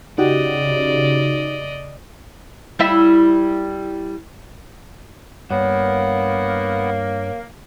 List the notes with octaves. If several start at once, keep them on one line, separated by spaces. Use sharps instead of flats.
C#3 D#4 F#4 G4 D5 D#5
G3 E4 E5
G2 A#3 B3 C#5 F#5